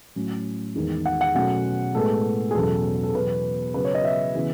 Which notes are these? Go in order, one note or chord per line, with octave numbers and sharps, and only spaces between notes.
A2 F#3 C#4
E2 D#3 G#3
F#5
F#5
B2 F#3 A3 C#4 F#5
A2 G#3 B3 A4
G#4
E2 B2 F#3 C#4 A4
A4
E2 B2 F#3 B4
C#3 F#3 B3 B4
C#5
D#5
E5
C#3 E3 B3